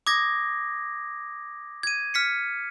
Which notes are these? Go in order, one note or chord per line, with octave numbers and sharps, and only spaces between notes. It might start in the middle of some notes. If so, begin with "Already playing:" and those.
D6 D#6 G#6 A#6
G#6 D#7
F6 B6 C#7